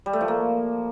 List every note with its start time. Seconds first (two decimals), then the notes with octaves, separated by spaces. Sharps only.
0.06 G3
0.13 A3
0.21 F3
0.28 A#3